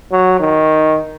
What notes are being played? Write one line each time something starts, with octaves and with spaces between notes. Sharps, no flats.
F#3
D#3